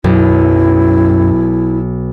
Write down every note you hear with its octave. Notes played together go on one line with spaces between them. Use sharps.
B1 F#2 E4